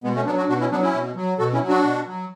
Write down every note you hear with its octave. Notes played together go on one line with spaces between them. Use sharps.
B2 G#3 B3
A3 C#4
F#3 B3 D4
D4 F#4
B2 D4 F#4
C#4 E4
F#3 B3 D4
C#4 E4
B2
F#3
B2 F#4 A4
C#4 E4
F#3
D4 F#4
B2
F#3